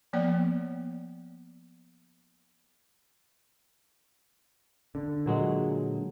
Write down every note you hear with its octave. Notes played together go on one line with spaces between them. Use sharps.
F3 A#3 B3 D5
D3
A#2 F#3 G#3